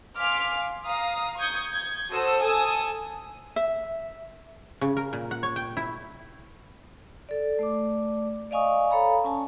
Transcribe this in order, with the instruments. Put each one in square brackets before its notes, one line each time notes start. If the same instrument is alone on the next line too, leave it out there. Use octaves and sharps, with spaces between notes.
[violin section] F5 G#5 C6 D6 F6 B6
F5 A#5 D#6
C#6 D#6 G6 G#6 C#7
G6 G#6
F#4 A4 C5 D#6 E6
A4 G#5 A5 D#6 E6
[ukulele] E5
[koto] C#3
A#4
A#2
F#5
C#5
G5
E4
[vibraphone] A4 D5
A3 D5 D6
D5 D#5 F5 G#5 C#6 D#6
A4 C#5 F5 A#5 B5
C#4 G#5 A5